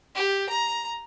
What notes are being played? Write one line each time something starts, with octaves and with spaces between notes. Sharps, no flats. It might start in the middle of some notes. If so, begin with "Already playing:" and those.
G4
A#5